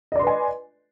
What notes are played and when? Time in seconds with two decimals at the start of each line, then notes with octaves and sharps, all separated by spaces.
0.12 D#5
0.16 D5
0.19 C6
0.23 B4
0.27 G#5